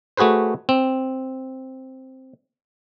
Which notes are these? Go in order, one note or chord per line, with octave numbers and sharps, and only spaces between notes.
A3 F#4 G#4 B4 C5
C4